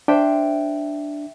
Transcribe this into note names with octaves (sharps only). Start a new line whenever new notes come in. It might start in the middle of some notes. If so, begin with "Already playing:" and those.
D4 C5 E5 G5